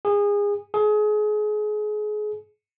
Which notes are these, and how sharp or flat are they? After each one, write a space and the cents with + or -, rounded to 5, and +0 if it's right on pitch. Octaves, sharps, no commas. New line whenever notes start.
G#4 -25
G#4 +30